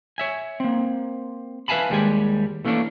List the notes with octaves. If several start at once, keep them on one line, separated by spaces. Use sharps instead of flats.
C#5 E5 G#5
A#3 C4
B4 E5 F5 G#5 A5 B5
D#2 G3 G#3 G4 G#5
E3 A3 A#3 C#4 D4